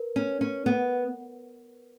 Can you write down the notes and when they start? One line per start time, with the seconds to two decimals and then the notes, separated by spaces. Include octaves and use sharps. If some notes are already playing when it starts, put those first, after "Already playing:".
Already playing: A#4 B4
0.16 C#4
0.41 C#4
0.66 B3